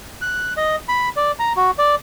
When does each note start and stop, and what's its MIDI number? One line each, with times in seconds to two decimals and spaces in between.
0.22 0.53 90
0.57 0.76 75
0.88 1.09 83
1.16 1.32 74
1.39 1.53 82
1.56 1.71 66
1.78 1.95 74